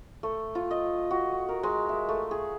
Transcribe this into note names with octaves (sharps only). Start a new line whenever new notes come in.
A3
F4
D#5
F#4
A#4
G#3
E5
A3
G#4